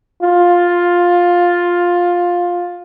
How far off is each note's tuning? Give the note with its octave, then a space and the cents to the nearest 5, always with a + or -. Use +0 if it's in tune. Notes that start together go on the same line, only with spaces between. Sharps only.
F4 +10